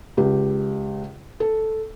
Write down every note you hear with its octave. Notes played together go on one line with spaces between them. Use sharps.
C#2 G4
A4